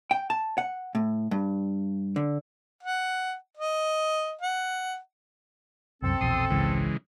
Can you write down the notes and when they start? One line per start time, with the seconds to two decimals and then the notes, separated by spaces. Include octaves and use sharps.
0.11 G5
0.30 A5
0.58 F#5
0.95 A2
1.31 G2
2.16 D3
2.83 F#5
3.57 D#5
4.42 F#5
6.02 C2 F#2 C4 A4
6.21 A#1 E2 B2 C6 D#6
6.51 G#1 C#2 C#3 E3 G#3